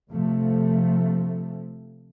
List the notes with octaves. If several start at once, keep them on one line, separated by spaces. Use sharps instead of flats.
C3 F3 A3